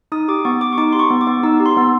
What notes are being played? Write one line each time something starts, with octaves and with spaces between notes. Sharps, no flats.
D#4 D#6
G4 D6
B3 C#6
B3 D6
C#6
D#4 D6
G4 C6
C#6
B3
D6
B3
D#4 E6
G4
C6
B3